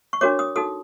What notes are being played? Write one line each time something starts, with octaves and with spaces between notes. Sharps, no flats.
C#6
D4 F#4 A#4 C#5 D6
D#6
D#4 F#4 A4 D#6